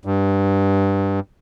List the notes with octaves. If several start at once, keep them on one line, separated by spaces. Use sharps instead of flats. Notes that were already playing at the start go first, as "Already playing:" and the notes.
G2